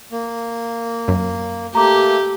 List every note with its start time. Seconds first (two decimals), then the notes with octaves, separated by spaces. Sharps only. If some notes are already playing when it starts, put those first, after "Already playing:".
0.12 A#3
1.08 F#2
1.75 A3 A#3 G4 A#5 D6